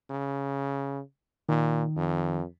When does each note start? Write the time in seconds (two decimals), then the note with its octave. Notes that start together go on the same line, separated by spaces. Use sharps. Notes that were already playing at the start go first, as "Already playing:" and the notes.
0.10 C#3
1.49 A#2 D#3
1.96 F2